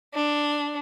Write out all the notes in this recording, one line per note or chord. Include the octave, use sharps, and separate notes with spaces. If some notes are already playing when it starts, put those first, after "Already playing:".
D4